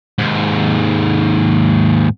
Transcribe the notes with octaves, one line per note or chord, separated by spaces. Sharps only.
D#2 G#2